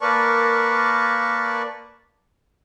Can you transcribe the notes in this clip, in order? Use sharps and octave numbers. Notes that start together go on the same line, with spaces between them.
A#3 A#4 B4 D5 A5 C#6